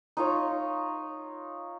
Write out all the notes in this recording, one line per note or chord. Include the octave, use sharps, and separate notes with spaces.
D#4 F4 C#5